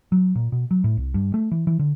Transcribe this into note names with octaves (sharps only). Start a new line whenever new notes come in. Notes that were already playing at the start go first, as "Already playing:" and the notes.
F#3
A#2
B2
F#3
A2
C2
G2
A3
E3
E3
D3